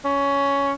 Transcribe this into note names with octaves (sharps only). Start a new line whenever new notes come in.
C#4